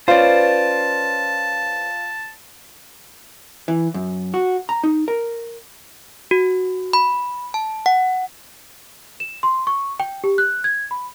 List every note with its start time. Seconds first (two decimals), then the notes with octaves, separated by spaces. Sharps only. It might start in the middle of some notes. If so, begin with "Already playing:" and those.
0.08 C#4 F4 B4 C5 D5 A5
3.68 E3
3.94 F#2
4.34 F#4
4.69 A#5
4.84 D#4
5.08 A#4
6.31 F#4
6.93 B5
7.54 A5
7.86 F#5
9.20 E7
9.43 C6
9.67 C#6
10.00 G5
10.24 G4
10.38 F#6
10.64 G#6
10.91 B5